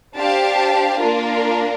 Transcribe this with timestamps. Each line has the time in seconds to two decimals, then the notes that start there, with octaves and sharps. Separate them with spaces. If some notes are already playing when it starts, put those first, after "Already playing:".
0.16 D4 G4 C5 F5 A5
1.00 A#3 D4 F4 A#4